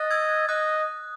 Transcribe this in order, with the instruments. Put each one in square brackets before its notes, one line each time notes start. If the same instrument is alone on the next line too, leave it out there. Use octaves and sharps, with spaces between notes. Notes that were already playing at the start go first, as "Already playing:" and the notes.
Already playing: [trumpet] D#5 [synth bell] F#6 A6
[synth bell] E6 G#6
[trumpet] D#5 [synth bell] D#6 F#6